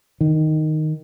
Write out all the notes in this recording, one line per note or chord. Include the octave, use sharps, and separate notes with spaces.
D#3